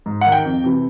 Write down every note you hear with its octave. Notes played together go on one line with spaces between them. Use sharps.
G#2
D#3 F#5
G5
F2
C3 E3